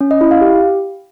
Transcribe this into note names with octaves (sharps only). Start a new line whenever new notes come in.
C#4
D#5
E4
F5
G4